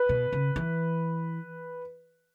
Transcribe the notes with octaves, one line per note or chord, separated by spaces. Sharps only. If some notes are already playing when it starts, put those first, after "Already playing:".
Already playing: B4
B2
C#3
E3